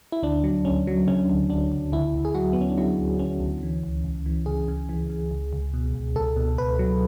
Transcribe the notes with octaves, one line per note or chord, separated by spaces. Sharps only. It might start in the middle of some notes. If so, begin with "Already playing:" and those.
E4
D2 D4
F#3
D2 C#4
F#3
C#3 C#4
D2
D2 D4
D2
D2 E4
D2
G#4
F#3 F#4
D2 B3
C#4
D4
F#3 E4
D2
D2 C#4
D2
E3
C#2
C#2
E3
C#3 G#4
C#3
E3
C#3
C#2
C#2
B2
C#2
C#2 A4
B2
C#2 B4
F#3